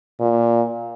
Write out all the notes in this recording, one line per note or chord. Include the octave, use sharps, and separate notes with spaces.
A#2